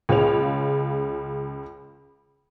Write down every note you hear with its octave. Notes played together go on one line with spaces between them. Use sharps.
C#2 C#3 F4 C#5 F7